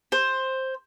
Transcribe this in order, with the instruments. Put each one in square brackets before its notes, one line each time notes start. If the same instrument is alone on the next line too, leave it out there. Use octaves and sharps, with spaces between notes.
[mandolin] C5